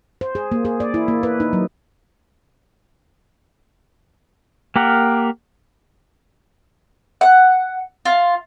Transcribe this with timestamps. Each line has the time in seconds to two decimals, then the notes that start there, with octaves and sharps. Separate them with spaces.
0.21 C5
0.35 G#4
0.52 A#3
0.65 G#4
0.80 D5
0.94 E4
1.08 A#3
1.23 B4
1.40 D#4
1.53 F#3
4.76 A#3 G4 A#4 F#5
7.21 F#5
8.05 F4